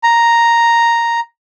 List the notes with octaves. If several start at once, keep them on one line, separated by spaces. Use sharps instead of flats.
A#5